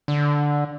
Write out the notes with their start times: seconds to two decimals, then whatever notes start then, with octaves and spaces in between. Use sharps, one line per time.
0.08 D3